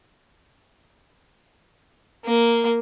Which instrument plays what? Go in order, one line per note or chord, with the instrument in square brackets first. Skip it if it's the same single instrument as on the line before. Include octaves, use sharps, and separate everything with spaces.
[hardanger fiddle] A#3